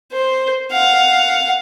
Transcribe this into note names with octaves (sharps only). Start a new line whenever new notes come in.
C5
F5 F#5